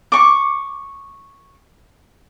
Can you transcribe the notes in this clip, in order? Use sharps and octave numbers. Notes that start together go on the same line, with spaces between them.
C#6 D6